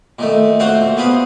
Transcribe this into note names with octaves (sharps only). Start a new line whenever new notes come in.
A#2 D#3 A3
A3 C4 F#4 C5 F5 F#5
A#2
B3 C4 G#4 F5 B5